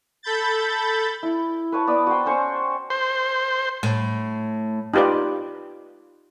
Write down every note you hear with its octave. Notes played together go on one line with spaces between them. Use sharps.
A4 B5 G6 A6
E4
B4 C#5 A5
B3 D5 B5 D#6
F#4 C5 G5
C#4 C5 C#6
C5
A2
D#4 F4 G4 B4 D5